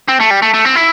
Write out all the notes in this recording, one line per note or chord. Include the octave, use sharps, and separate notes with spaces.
C4
A3
G3
A3
A3
C4
E4